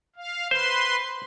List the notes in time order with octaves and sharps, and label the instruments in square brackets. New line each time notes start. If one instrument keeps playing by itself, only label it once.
[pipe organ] F5
[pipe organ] B4 C6 [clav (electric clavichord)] C5